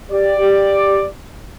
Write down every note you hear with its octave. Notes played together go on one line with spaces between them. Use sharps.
G4 D5